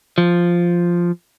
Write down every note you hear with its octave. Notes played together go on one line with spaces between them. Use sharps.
F3